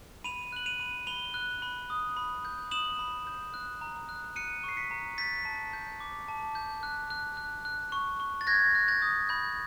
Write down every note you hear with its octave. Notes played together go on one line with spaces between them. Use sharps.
B5 D#7 F7
F#6 F#7
D#7 F7
B5
B5 F7 G7
F#6
B5
D#6
B5
G6
D#6 E7 F#7
B5
G6
F#6
A#5
F#6
F#6 C#7 D#7
C#6
C7
B6 C#7
A#5
G6 A6 B6
A5
G6
D6
A5
G6
F#6
F#6
F#6
F#6
C#6
C#6
A6
F#6 G#6 A#6
F#6
G6 A6
D#6
B5 G6